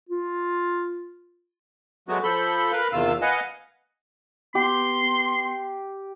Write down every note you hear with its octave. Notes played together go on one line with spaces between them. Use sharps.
F4
F#3 G#3 A3 B3 F#4
F3 A4 B5 G6
A#4 B4 F5 B5
E2 C3 D#3 F4 F5 E6
B4 D#5 F5 F#5 G#5
B3 G4 C6